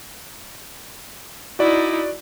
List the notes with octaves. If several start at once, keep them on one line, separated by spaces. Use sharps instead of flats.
D#4 E4 F#4 D5